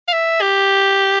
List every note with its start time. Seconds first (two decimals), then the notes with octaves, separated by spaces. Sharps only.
0.08 F5
0.13 E5
0.41 G4